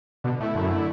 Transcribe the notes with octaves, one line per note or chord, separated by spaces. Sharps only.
B2 D3
A2 A3 E4
F#2 D3
A3 E4